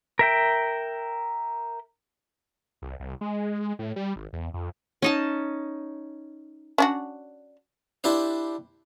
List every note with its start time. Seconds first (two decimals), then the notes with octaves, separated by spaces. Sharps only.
0.19 A#4 E5 G5
2.82 C2
3.00 C2
3.21 G#3
3.79 A2
3.96 G3
4.16 G#1
4.33 E2
4.54 F2
5.02 C#4 D#4 A5
6.78 C#4 D4 F#4
8.04 D4 E4 G4 B4 C5